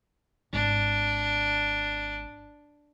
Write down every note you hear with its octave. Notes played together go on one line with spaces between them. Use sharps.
G#1 D4